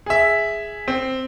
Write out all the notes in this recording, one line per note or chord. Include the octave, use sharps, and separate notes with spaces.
G#4 E5
C4